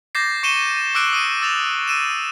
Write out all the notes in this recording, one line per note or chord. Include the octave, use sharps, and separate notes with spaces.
D6 G6 A6 A#6 C7
C#6 C#7 D#7 E7 G7
D6 E6 F#6 D7
D#6 D#7
E6 A6 F7
E6 D#7 E7